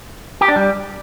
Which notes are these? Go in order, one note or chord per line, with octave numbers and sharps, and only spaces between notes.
G4
D4
G3